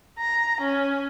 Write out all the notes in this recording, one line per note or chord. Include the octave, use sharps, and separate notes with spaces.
A#5
C#4